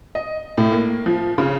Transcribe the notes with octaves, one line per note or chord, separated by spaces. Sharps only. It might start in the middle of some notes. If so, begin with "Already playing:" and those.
D#5
A2
A#3
F3
C#3